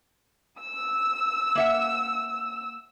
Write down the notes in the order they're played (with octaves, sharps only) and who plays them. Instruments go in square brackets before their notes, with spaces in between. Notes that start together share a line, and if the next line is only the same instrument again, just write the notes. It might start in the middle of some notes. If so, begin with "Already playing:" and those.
[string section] E6
[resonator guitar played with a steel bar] A#3 E5 F#5